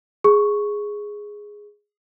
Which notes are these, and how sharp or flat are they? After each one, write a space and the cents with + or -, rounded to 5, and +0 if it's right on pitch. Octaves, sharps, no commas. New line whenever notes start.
G#4 +0 C#6 +0